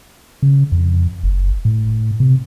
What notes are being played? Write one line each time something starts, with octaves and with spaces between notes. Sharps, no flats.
C#3
F2
F#1
A2
C3